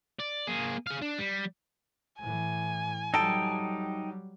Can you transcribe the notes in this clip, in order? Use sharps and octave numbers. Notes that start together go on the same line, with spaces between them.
D5
A#3 G#4
G#4 F5
D4
G3
A2 E3 G#5
F#3 G3 D#4 A4 G5